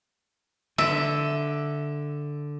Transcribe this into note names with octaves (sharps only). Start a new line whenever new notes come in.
D3 E5